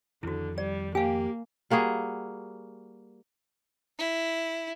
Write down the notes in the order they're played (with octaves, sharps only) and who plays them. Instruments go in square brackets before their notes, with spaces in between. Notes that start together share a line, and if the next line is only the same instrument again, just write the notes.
[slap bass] F2 D#3 [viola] D3 [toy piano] E4 F#4
[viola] G3 [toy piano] D5
[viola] A#3 [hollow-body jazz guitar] G4 [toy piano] F5 G#5
[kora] G3 A#3 F#4 G#4
[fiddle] E4